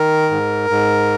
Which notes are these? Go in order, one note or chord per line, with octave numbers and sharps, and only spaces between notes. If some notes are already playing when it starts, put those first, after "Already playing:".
Already playing: D#3 A#4
G#2
G#2